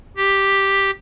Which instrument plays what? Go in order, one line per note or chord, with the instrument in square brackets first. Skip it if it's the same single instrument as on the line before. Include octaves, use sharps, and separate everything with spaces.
[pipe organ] G4